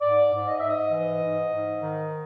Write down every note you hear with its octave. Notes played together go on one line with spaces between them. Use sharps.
G#2 D5
G#2
D#5
G#2 E5
D#5
E3
G#2
G#2
D#3